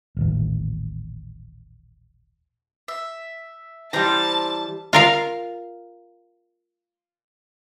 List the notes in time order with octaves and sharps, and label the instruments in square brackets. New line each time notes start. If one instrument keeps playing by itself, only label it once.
[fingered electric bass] D#1 A1
[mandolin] E5
[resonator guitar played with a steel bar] E3 G3 [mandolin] C5 G5 A#5 [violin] A5
[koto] F4 A#4 F5